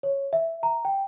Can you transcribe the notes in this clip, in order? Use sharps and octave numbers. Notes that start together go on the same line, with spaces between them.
C#5
E5
A#5
G5